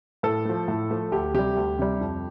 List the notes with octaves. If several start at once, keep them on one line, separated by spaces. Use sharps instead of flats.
A2 A4
F3 A3
A2
F3 A3
D2 G4
C3 G3 G4
D2
C3 G3
F2